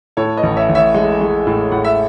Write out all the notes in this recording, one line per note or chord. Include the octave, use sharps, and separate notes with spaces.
A2 A4 C#5
B4 D#5
A1
C#5 E5
A1
C#5 E5
G#3
G#3
A2
A2 F#5
E5